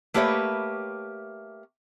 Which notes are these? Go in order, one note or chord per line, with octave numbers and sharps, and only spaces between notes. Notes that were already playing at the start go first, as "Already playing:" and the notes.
A3 A#3 G4 B4 C#5 E5